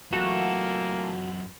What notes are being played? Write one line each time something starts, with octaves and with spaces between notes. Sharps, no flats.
F#2 E3 A3 A#3 F4 F#4 A4